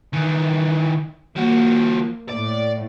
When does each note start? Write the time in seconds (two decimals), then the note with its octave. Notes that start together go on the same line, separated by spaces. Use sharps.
0.14 D#3 E3
1.36 F3 A#3 F#4
2.30 A2 D5